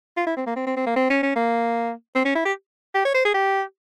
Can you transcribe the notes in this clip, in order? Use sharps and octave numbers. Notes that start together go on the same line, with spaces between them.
F4
E4
C4
A#3
C4
C4
C4
A#3
C4
C#4
C#4
A#3
C4
C#4
E4
G4
G4
C#5
C5
G#4
G4